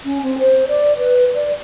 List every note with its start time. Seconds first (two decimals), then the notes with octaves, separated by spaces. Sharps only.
0.05 C#4
0.23 C4
0.39 C5
0.68 D5
0.98 B4
1.34 D5